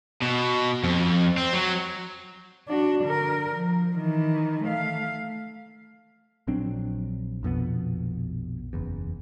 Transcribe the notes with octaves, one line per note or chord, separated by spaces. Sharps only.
B2
F2
C4
F#3
D4 F#4
D3 A#4
F3
D#3 E3
A3 F5
A#1 F#3 C4 D4
A#1 F2 B2 B3
F#1 E2